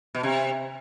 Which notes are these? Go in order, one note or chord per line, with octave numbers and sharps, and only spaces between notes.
B2
C3